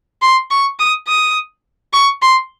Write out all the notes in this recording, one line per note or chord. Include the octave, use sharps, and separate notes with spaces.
C6
C#6
D#6
D#6
C#6
C6